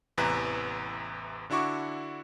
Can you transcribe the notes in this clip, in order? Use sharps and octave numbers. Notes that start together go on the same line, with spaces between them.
A1 E2 C3 E3 B4 A#5
D3 D4 E4 F#4 C#6 D6